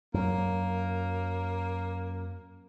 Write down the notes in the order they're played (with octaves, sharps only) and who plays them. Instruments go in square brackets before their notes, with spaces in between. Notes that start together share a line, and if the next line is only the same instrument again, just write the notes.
[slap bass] F#2 F#3 [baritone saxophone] A#3